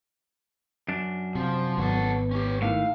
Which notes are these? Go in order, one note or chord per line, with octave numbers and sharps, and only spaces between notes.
F#2 D4
C3 F3
G#1 F#3 B3 F#4 A4
C#4 G4
A2 D#3 F5